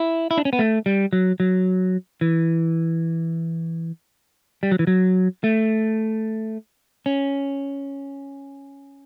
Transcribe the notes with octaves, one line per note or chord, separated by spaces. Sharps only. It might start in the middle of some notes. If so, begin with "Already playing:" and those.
Already playing: E4
E4
D4
C#4
B3
A3
G3
F#3
F#3
E3
G3
F#3
E3
F#3
A3
C#4